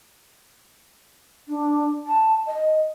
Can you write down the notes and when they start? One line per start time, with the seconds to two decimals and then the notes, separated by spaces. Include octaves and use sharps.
1.48 D4
2.07 A5
2.47 D#5